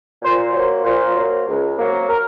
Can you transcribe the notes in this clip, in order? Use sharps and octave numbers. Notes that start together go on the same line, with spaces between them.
A#2 C5
F#3 A#3 C5
A#2 C5
F#3 A#3
C#2
C3 F#3 A#3
A#4